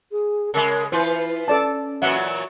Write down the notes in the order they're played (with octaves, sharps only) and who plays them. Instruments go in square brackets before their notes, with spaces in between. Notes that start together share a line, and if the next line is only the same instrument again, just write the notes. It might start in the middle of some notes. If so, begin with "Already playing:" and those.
[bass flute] G#4
[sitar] C#3 G#3 [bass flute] A#4
[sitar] E3 F4 B4 [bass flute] E4 [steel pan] C5
[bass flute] C#4 [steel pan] A4 D5 A5
[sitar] A#2 E3 F#3 [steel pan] E5 F#5